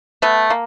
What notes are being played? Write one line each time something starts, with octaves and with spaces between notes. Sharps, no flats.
A3 B3
A#3